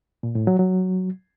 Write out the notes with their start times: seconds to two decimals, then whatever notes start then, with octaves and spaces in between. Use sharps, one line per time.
0.23 A#2
0.35 A2
0.47 F#3
0.59 F#3